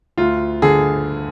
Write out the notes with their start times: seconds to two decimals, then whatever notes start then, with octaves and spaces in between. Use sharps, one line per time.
0.17 D2 F4
0.62 D3 G#4